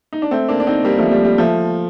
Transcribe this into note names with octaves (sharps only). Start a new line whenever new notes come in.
D#4
D4
A3 C4
A#3 D4
D4
C4 D#4
G3 A#3
F3 A3
G3
G3
F3 A3